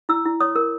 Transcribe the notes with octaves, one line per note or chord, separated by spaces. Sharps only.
E4 E6
E4
C#5 D#6
A#4